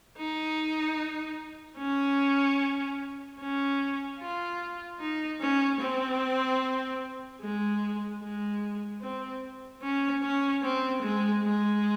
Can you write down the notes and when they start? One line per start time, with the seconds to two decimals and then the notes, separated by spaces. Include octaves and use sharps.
0.17 D#4
1.78 C#4
3.39 C#4
4.19 F4
5.00 D#4
5.41 C#4
5.80 C4
7.41 G#3
8.21 G#3
9.02 C4
9.82 C#4
10.23 C#4
10.63 C4
11.02 G#3
11.43 G#3